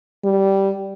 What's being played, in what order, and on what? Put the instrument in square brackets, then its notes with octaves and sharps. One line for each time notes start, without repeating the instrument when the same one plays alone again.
[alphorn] G3